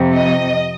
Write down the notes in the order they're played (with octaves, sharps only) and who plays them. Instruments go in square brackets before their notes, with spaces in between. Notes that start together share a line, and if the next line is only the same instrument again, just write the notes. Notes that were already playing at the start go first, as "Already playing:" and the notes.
Already playing: [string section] F2 C3 F3
D#5